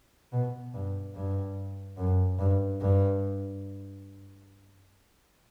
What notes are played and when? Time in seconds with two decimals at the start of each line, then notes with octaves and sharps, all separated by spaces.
0.33 B2
0.74 G2
1.15 G2
1.97 F#2
2.39 G2
2.81 G2